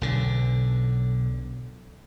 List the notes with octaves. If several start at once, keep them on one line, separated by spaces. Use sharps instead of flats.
B1 D3